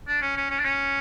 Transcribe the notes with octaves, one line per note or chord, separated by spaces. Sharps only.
D4
C#4
C#4
C#4
D4
C#4